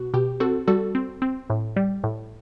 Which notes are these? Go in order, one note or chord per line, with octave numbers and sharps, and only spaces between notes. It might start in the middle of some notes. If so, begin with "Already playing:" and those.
Already playing: B2 F#4
B2 G4
C4 F#4 A4
G3 F#4 A4
C4
C4
A2
G3
A2